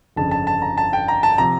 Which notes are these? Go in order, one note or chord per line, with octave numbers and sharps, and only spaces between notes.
G1 F2 C#3 A5
A5
A5
A#5
A5
G5
A#5
A5
C3 F3 A#5